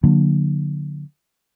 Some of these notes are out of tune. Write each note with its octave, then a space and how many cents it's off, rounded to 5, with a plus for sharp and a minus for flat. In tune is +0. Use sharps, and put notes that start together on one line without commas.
D3 +0 F#3 -35 A#3 +0